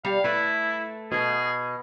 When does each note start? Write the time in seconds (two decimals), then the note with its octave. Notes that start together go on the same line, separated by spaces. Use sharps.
0.05 G3 F5
0.24 A3 E4 B4
1.12 B2 G#4